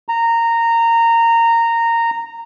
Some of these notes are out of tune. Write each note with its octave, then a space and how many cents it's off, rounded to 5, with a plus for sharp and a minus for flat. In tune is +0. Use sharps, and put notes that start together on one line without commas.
A#5 -15